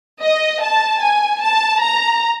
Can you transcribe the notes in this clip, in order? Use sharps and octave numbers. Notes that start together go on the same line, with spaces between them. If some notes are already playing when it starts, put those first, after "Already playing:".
D#5
A5
G#5
A5
A#5